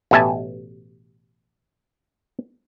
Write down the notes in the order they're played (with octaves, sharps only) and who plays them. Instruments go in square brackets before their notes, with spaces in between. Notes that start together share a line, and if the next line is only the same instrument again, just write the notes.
[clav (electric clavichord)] A1 B2 G4 E5 G#5 A5